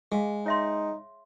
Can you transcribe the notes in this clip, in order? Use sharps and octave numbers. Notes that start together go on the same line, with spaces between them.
G#3 G#4 F5
D#4 C#5 E5 C6